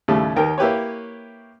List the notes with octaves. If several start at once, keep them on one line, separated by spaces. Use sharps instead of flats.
D#2 A2 C#3 G3 A3
D#2 D#3 A#4 G5
A#3 E4 G4 B4 C#5